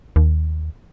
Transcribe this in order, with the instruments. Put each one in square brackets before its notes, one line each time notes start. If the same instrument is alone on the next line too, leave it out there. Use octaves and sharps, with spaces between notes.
[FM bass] D#2